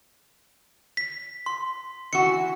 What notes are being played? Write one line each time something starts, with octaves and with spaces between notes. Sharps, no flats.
B6
C6
E3 F#4 C#7